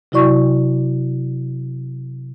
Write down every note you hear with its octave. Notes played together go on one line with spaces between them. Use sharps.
C3 F#3 E4 F#4 D5 C#6